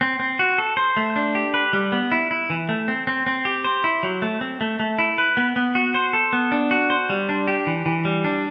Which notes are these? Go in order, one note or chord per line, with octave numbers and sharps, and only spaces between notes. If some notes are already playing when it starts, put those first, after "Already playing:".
C4
C4
F#4
A4
C5
A3
D4
G4
B4
G3
B3
E4
E4
E3
A3
C4
C4
C4
G4
C5
E4
F#3
A3
C4
A3
A3
E4
B4
B3
B3
F#4
C5
A4
B3
D4
F#4
C5
G3
D4
G4
E3
E3
G3
D4